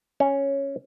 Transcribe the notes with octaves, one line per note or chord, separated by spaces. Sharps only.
C#4